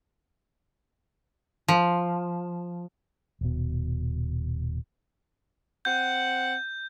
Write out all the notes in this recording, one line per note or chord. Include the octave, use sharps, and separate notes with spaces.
F3
D#1 B2
C4 F#5 G6